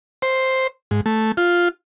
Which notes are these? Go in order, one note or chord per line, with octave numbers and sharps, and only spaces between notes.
C5
G#2
A3
F4